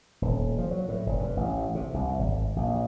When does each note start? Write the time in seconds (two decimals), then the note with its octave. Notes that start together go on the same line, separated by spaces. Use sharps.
0.22 D#1
0.58 F3
0.71 F#3
0.88 A2
1.06 F1
1.19 G2
1.37 A1
1.75 C3
1.94 C2
2.19 G#1
2.56 A#1